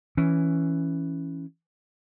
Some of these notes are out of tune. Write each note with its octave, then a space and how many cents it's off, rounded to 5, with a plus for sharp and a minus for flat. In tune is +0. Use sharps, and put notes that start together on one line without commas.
E3 +0 C#4 +0